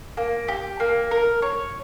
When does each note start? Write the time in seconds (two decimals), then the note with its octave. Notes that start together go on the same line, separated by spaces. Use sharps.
0.17 A#3
0.48 G4
0.80 A#3
1.11 A#4
1.42 C#5